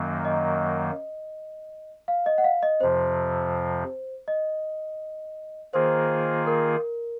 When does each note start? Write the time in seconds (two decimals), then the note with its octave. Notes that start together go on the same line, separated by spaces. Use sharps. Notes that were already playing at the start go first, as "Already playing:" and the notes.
Already playing: F#2 D#3 F#3 A#3
0.25 D#5
2.08 F5
2.26 D#5
2.38 F#5
2.44 F5
2.63 D#5
2.81 F2 C3 F3 C5
4.28 D#5
5.73 D#3 A#3 F4 G#4 C5
6.47 A#4